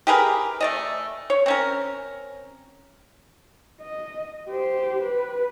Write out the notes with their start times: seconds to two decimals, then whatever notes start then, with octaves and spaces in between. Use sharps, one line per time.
0.07 G4 G#4 A#4 B4
0.61 A3 D5 D#5
1.30 C#5
1.46 C4 C#4 A#4
3.81 D#5
4.50 G4 C5
5.03 B4